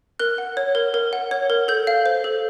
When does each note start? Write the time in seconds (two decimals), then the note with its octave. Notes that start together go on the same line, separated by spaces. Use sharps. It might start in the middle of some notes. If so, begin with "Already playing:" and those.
0.19 A#4 F#6
0.38 F#5
0.57 C#5
0.75 A#4
0.94 A#4
1.13 F#5
1.31 C#5
1.50 A#4
1.68 A4 G6
1.87 F5
2.06 C5
2.24 A4